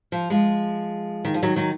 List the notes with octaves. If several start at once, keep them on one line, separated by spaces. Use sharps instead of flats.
F3
F3 G#3
D#3
F3
D#3 F#3
D#3 F#3